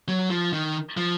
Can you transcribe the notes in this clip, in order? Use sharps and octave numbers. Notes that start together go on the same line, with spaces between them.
F#3
F3
D#3
F3